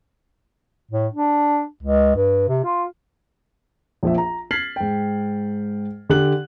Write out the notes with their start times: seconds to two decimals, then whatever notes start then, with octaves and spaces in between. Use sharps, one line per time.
0.91 A2
1.14 D4
1.83 C#2
2.16 G2
2.48 C3
2.64 F4
4.03 A#1 F3 E5
4.18 A#5
4.51 F6 G#6 A6 B6 C7 F#7
4.76 G#2 G5
6.09 D3 G4 F#6 F#7